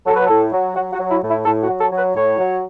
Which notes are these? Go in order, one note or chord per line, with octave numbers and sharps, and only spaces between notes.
F#3 A4
B4
A2 A4
F#3
F#3 F#4
F#4
F#3
E4
A2
E4
A2 A4
F#4
F#3
A4
F#3
B4
A2 C#5
F#3